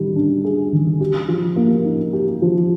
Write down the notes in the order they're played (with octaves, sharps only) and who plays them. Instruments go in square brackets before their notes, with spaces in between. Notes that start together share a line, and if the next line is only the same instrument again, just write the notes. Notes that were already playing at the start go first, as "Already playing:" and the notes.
Already playing: [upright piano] D#3 G3
D4
G#4
D#3
G4
F3
A#3
D#4
G4
F3